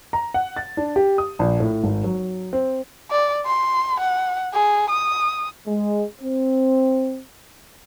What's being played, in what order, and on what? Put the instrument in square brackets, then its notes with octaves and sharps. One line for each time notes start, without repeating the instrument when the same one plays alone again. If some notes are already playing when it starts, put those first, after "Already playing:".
[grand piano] A#5
F#5
A6
D4
G4
D#6
A#1
A2
G#1
F#3
C4
[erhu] D5
C6
F#5
G#4
D#6
[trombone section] G#3
C4